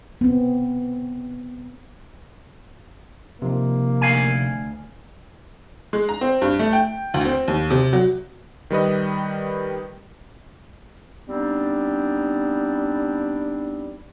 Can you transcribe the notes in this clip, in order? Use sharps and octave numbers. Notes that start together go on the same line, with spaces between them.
B3 C4
C3 F3 A#3 D#4
D2 F5 G#5
G#3
A#5
C4
G2
A3
G5
D2
C4
D#2
C3
F#3
D#3 G3 B4 D#5
G3 B3 C4 D4 D#4